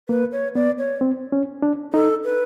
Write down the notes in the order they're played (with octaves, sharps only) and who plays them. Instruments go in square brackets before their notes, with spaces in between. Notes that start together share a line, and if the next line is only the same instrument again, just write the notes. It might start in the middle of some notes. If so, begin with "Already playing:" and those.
[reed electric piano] A#3 [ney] B4
[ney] C#5
[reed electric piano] B3 [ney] D5
[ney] C#5
[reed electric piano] C4
C#4
D4
[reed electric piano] D#4 [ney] A4
[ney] B4